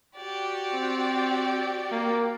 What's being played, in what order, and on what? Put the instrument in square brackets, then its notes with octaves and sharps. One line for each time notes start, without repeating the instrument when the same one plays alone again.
[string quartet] F#4 G4 D5
[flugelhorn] C4
A#3